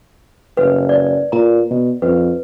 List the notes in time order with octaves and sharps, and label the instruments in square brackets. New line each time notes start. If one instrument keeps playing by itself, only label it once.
[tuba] F#1 [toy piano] B4
[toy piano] D5
[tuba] A#2 [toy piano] A#5
[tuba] B2
[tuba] F2 [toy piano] B4